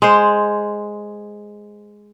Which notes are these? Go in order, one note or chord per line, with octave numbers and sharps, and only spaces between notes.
G#3 C5